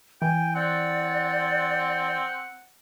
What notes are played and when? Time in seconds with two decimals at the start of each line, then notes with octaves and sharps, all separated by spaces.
0.22 E3 G5 G#5
0.55 C4 D5 F#5